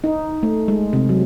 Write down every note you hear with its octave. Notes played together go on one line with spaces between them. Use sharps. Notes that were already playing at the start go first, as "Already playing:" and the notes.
D#4
A3
G#3
C3
F#3